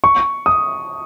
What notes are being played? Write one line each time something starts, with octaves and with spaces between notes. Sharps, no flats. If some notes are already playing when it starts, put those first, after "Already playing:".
C#6
D#6